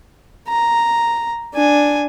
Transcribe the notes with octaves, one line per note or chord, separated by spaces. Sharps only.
A#5
D4 G#5